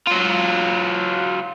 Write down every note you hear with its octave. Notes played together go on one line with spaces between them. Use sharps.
F#3 F4